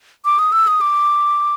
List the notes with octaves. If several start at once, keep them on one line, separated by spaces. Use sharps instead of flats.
D6
D#6
E6
D#6
D6